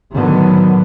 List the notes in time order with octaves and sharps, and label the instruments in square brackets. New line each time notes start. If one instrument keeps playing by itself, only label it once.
[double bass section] A2 D3 D#3 F#3 B3